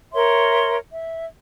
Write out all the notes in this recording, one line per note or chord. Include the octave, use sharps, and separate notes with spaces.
A#4 C#5 E5 C6
E5